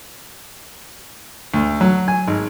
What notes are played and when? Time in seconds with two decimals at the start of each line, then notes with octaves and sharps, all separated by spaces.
1.54 D2
1.81 F#3
2.08 G#5
2.28 G#1